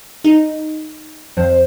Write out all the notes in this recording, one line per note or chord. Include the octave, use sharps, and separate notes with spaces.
D#4
F2 C5